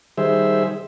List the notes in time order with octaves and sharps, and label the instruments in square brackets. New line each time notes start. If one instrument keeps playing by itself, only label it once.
[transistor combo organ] D#3 G3 G#4 C5 E5